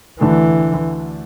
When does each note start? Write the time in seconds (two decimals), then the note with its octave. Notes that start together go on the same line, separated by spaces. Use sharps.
0.20 D2 D3 E3 A3 D4